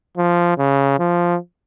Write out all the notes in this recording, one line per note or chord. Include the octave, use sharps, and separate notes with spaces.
F3
C#3
F3